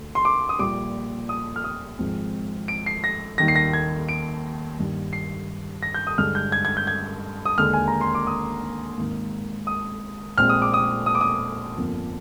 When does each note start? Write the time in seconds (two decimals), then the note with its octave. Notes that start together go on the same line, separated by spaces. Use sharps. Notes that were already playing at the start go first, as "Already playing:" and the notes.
Already playing: D2
0.15 C6
0.25 D6
0.49 D#6
0.59 A#1 A#2 G3 D6
1.29 D#6
1.56 F6
1.64 D#6
1.99 G#1 G#2 F3 G#3 C4
2.68 D7
2.86 C7
3.04 A#6
3.38 D#2 D#3 G3 A#3 A#6
3.48 C7
3.56 A#6
3.73 G#6
4.09 D7
4.78 G2 D#3 A#3
5.13 C7
5.83 A#6
5.94 G6
6.07 D#6
6.18 G2 D3 G#3 F6
6.35 G6
6.52 G#6
6.65 G#6
6.77 G6
6.87 G#6
7.45 D#6
7.58 D#2 D3 G#3 F6
7.73 G#5
7.88 A#5
8.01 C6
8.15 D6
8.27 D#6
8.98 G#1 G#2 D#3 A#3
9.67 D#6
10.38 A#1 A#2 G#3 C4 F6
10.49 D#6
10.62 D6
10.74 D#6
11.06 D#6
11.15 D6
11.21 D#6
11.77 G1 F2 D3 F3 A#3